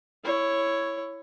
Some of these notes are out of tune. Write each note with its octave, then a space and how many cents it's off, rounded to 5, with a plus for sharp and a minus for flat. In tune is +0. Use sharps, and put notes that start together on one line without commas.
E4 +10 C#5 +0